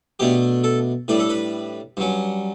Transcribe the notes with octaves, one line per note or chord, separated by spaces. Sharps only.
B2 A3 D4 G4
A4
A2 G3 D4 B4
A4
B4
G2 F#3 C#4